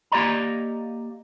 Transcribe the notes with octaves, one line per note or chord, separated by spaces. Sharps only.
A#3 G4 D5 D#5 A#5